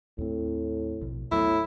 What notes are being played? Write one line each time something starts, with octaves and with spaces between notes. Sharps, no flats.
D#2 A2 C4
A#1 B2
D#2 A2 F#3 B3 E4